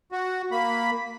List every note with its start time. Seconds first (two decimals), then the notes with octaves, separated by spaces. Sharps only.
0.12 F#4
0.51 A#3 B5